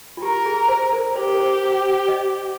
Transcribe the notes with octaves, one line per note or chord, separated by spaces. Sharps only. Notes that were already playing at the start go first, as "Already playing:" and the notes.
F4
G4 A#4
G#4
C5
A#4
G4 C5
A#4
C5
D#5